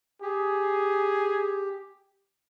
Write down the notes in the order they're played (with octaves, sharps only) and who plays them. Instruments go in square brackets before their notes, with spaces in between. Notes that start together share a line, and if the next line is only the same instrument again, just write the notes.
[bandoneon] G4 [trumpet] G#4